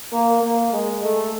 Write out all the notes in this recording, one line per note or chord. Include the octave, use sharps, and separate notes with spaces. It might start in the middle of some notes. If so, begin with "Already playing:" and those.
A#3
A#3
G#3
A3